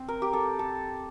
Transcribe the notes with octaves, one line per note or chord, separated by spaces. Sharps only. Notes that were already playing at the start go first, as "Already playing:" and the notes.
Already playing: C4
A#4
G4
A4
A4